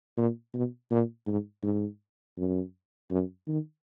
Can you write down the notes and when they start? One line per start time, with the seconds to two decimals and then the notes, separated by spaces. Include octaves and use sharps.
0.17 A#2
0.54 B2
0.91 A#2
1.27 G#2
1.63 G#2
2.38 F#2
3.11 F#2
3.48 D#3